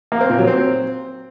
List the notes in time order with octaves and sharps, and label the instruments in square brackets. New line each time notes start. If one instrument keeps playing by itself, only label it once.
[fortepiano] A#3
C4
A#2
F#3
C4